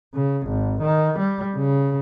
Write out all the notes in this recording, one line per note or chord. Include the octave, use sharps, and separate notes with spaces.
C#3
G#1
D#3
G3
C#3